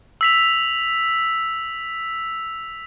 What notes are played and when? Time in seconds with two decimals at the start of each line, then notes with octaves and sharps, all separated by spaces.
0.21 E6 B6 F7